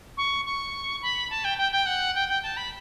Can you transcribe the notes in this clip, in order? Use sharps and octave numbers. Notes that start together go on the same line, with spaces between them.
C#6
C#6
B5
A5
G5
G5
G5
F#5
G5
G5
A5
B5